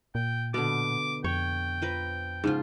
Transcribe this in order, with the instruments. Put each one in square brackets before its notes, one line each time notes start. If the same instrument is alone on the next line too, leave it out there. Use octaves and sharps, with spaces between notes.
[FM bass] A#2 [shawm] G5
[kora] B2 [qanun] D3 B3 [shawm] D6
[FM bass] F2 [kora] C#5 [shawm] G5
[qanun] F3 B4 A#5
[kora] G#2 [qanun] C#3 F3 F4